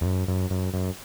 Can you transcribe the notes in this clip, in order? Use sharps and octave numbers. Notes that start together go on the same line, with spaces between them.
E2
F#2
F#2
F#2
F#2